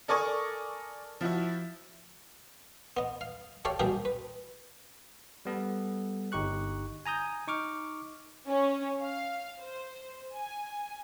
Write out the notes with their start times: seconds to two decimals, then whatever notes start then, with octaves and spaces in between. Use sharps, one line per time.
0.08 A4 A#4 D5 G#5 C#6 D#6
1.21 F3 E4 F#4 E5
2.97 B3 D#5
3.21 F5
3.65 G4 A4 C#5 D5 F5 G5
3.80 B2 G3 A#3 D4 G4 G#4
4.05 B4
5.45 G3 B3 A4
6.32 G1 D#4 G4 C#6 F#6
7.06 G#5 A#5 D#6 G6
7.47 D#4 C#6 D6 F6
8.48 C#4
9.01 F5
9.61 C5
10.34 G#5